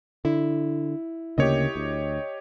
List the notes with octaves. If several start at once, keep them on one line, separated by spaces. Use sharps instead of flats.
D3 E4
D2 C#3 A#3 G4 C#5 D#5
D2